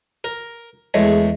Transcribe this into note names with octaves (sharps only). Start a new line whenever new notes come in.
A#4
E2 G#3 A3 C#5